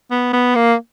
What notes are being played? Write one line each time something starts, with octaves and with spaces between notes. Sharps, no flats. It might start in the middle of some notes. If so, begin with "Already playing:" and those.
B3
B3
A#3